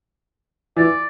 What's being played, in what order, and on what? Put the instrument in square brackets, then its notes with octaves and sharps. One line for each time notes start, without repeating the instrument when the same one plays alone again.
[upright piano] E3 [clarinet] D5